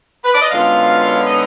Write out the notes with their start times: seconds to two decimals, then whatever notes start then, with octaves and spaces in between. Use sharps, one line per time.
0.24 B4
0.33 D5
0.42 D#5
0.50 F#2 D3 G#3 B3 F4 F5
1.25 D#4 D#5